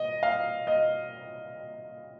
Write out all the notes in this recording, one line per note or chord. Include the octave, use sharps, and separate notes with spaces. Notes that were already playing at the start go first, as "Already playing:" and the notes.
Already playing: D#5
F5
D#5